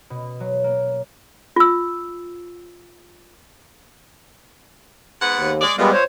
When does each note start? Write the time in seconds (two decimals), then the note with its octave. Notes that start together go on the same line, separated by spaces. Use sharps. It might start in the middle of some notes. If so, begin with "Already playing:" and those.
0.10 B2
0.40 F#3
0.64 A#3
1.56 F4 E6
5.21 G#2 B3 F#5
5.33 D#2
5.61 G#3 D5
5.78 A#2 G3 G#3 B3
5.93 C5 C#5